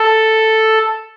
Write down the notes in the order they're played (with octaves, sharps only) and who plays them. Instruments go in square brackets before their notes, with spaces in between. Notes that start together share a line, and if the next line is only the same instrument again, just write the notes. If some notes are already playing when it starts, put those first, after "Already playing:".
Already playing: [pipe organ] A4